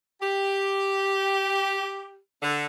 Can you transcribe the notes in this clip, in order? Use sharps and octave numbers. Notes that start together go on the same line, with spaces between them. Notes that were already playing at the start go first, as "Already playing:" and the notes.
G4
D3